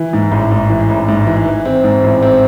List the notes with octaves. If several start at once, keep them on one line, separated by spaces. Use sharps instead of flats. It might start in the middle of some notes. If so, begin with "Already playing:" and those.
Already playing: E3
G#2
A1
G#2
E3
A1
G#2
E3
E3
C4
G#2
A1
C4